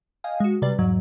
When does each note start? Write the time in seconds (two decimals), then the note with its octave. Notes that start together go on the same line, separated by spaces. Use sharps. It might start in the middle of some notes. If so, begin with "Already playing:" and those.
0.24 D#5 F5 G5 G#5
0.40 G#3 F#4
0.62 C3 G3 B4 D5 A6
0.79 E2 G#2 F#3